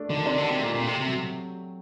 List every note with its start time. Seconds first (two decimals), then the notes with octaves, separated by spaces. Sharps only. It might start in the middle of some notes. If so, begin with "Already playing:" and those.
Already playing: A3 D4
0.10 D3 D#3
0.26 C3 D4
0.38 D3 G4
0.51 C3
0.59 A#2 A3
0.75 A#2 C4
0.87 C3
0.92 G4
1.00 C3
1.08 F#3